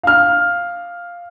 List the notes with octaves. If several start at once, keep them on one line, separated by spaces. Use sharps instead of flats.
F5 F6